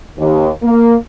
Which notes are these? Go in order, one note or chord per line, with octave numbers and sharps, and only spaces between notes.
D#2
A#3